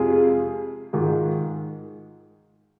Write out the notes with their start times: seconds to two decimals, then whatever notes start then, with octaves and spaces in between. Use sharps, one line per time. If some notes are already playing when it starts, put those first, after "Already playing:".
Already playing: F2 C3 G#3 F4 G#4
0.93 G#2 D#3 G#3 F4